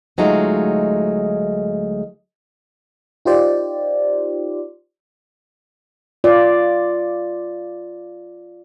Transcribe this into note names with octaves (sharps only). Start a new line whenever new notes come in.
D2 F#3 G#3 A3 D#4 F4
D#4 F4 G4 C5 D5
F4 D5